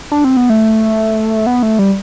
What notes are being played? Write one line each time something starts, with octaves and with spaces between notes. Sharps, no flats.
D4
C4
B3
A3
B3
A3
G3